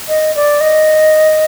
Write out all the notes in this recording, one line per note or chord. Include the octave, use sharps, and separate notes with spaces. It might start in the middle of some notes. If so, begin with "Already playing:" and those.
D#5
D5
D#5